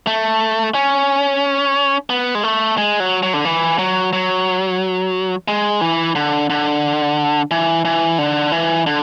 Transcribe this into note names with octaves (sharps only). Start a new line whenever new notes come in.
A3
C#4
B3
G#3
A3
G#3
F#3
F#3
D3
E3
F#3
F#3
G#3
E3
D3
D3
E3
E3
D3
E3
D3